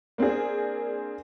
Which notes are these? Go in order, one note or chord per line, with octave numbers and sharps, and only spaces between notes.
A#3 C4 D4 G#4